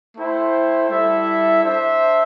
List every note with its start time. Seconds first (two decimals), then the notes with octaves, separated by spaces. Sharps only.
0.16 A3 E4 C5 G5
0.89 G3 E4 A4 E5
1.63 D4 C5 E5